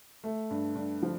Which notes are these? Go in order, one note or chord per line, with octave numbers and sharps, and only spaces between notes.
A3
G2
G2
F3